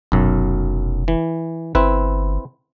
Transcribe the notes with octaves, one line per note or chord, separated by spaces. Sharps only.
F1 B1 F#2
E3
G1 C4 E4 B4